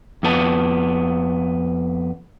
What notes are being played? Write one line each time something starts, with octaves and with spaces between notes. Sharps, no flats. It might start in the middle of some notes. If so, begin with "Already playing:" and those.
F2 B3 A5